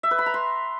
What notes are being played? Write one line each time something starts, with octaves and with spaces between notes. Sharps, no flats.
E5
B4
B5
A#5
C6